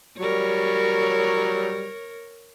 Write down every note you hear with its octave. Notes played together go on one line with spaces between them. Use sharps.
F#3 G3 A#4 C#5